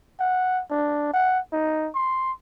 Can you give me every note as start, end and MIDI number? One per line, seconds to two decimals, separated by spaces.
0.20 0.62 78
0.71 1.12 62
1.14 1.39 78
1.52 1.89 63
1.95 2.32 84